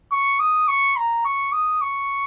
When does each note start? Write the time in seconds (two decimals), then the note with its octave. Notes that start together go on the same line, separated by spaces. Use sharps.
0.12 C#6
0.40 D#6
0.68 C#6
0.97 A#5
1.25 C#6
1.53 D#6
1.81 C#6